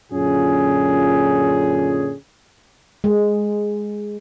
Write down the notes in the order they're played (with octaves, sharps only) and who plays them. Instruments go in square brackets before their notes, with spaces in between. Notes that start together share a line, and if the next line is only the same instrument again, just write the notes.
[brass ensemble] F#2 A#2 D3 C#4 F4 G#4
[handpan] G#3